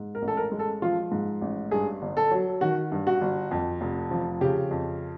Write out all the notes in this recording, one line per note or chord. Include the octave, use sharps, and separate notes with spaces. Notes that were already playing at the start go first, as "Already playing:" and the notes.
Already playing: G#2
A#4
A1
A4
A#4
G#3
A4
F3 F4
G#2
A1
G2 G#4
G1
A4
F#3
D#3 F#4
G2
F#4
G1
F2
F1
F3
C#3 G4
F2